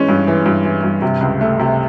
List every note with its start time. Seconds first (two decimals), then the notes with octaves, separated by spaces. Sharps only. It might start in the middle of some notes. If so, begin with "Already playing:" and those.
Already playing: E3 G#3 C#4
0.09 G2
0.28 E3
0.46 G2
0.65 E3
0.84 G2
1.02 C3
1.21 C#2
1.41 A3
1.60 C3